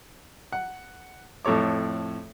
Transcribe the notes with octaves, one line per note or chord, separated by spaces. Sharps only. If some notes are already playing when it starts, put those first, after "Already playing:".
F#5
F2 A2 A4 C#5 D6